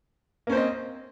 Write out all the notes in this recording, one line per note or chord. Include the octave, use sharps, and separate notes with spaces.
A#3 C4 C#4 C5 D#5